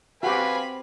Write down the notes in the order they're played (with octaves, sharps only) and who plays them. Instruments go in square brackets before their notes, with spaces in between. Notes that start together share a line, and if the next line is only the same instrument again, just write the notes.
[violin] C4 B5 [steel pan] F#4 G4 [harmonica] B4 F5 G#5